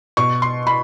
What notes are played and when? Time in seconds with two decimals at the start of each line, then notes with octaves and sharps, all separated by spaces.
0.17 B2 C#6
0.42 C6
0.67 B5